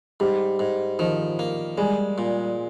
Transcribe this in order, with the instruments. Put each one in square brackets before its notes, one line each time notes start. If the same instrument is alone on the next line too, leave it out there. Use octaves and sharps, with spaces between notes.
[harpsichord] G#2 [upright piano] G3
[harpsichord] G#2
[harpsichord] D#3 [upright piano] F3
[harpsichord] A#3
[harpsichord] G3 [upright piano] G#3
[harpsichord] A#2